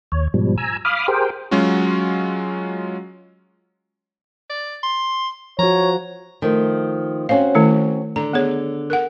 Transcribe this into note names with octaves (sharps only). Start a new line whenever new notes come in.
D#2 C#5
G#2 B2 F3 G3
G#5 A#5 E6
F5 B5 D6 D#6 F6
G4 G#4 A#4 C5 G5
F#3 G#3 C#4 F4 F#4
D5
C6
F3 F#4 C#5 A#5
D#3 F3 A3
C4 C#4 F#4 F5
D#3 A3 E4
D3 A#5
B3 G#4 C#5
A#4 F#5